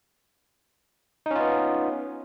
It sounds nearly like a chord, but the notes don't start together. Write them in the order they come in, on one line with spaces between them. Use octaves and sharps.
D#4 C#4 F4 B3